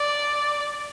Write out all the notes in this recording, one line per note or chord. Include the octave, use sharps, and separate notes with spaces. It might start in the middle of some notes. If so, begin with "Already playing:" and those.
Already playing: D5